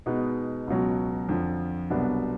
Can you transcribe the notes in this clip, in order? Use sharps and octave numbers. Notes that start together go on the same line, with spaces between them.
B2 G#3 B3 D#4
C#2 B2 F#3
F2 D3 F3
C2 B2 F#3 B3 D4